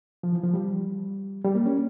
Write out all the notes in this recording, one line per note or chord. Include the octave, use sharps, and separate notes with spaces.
F3
E3
F3
G3
G3
A#3
C#4